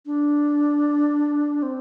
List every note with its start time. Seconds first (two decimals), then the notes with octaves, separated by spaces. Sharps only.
0.06 D4
1.63 C4